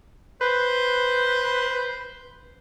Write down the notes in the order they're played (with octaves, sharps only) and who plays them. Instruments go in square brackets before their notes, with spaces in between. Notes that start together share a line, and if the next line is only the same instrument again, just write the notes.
[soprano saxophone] B4 [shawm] C5